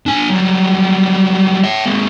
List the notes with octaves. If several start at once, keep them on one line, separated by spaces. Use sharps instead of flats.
D4 G#5
F#3 G3
C#5 E5
G#3 A#3